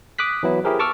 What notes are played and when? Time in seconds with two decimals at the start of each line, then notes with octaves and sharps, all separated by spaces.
0.19 D6 D#6 F#6 B6
0.43 E3 F#3 B3 E4
0.64 E4 G4 G#4 A#4 C5
0.79 A5 C#6 D6 E6 F6